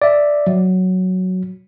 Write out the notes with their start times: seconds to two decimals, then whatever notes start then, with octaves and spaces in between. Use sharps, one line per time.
0.02 D5 E5
0.47 F#3